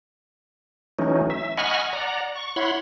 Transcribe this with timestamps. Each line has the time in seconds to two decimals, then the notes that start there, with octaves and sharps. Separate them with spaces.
0.99 E3 F#3 A3 C#4 D#4
1.30 E5
1.57 D#5 F#5 G#5 B5 C#6 F6
1.93 D5 F#5 A#5
2.35 C#6
2.56 E4 C#5 F#5 B5 C6